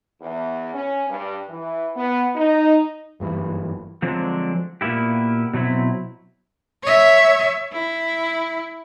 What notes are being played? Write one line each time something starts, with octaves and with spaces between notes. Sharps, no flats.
E2
C#4
G2
E3
B3
D#4
F#1 G2 A#2 E3
D3 F3 F#3 G#3 C4 D4
A#2 A#3 B3 E4 G4
B2 F#3 C4 E4
C#5 E5
E4